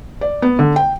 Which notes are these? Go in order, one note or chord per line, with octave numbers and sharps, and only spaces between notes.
D5
B3
D3
G5